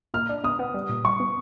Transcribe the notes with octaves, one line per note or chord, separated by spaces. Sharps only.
A#2 F6
D4
B3 D#6
B3
G3
A#2
G3 C#6
B3